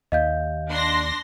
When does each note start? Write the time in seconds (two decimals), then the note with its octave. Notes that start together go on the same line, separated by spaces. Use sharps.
0.12 D#2 D#5 F5 G6
0.69 D4 C6 A#6